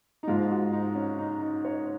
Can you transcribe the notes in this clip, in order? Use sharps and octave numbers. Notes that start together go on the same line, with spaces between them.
D#4
G#2 F3 G#3 F4
F#4
D#4
C#4
D#4
D#4
C#5